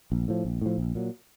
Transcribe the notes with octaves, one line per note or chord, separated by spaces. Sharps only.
A#1
A2 F3
A#1
A2 F3
A#1
A#2 F#3